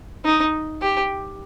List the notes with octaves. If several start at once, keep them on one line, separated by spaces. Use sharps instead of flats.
D#4
G4